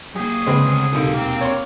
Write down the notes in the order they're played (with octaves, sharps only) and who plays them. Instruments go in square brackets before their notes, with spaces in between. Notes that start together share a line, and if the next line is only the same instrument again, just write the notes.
[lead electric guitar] F#3 A#3 [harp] G4 [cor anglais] G#4
[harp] C#3 [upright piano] G#3 C4 B4
[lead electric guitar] D2
[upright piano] E1 D#2 C3 [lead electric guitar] F#3 A4 [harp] D7
[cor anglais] A#3 [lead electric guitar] C4 G5
[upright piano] C#5 C#6